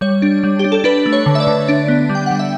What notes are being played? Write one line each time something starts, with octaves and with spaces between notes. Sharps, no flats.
G3 C#5
D4
G3
D4 G4
A4
D4 B4
A3
C#5
D3
E5
D5
D3
D4
B3
G3
G5
G3 F#5
E5